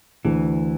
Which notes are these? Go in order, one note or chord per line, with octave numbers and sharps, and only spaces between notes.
D2 E3